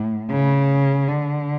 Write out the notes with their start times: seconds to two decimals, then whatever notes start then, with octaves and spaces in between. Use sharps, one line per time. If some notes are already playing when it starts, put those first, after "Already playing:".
Already playing: A2
0.30 C#3
1.08 D3